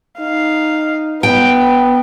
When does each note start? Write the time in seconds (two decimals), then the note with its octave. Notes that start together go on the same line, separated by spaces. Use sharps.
0.20 D#4 F5
1.23 B3 G5